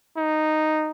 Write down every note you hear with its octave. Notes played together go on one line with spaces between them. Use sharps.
D#4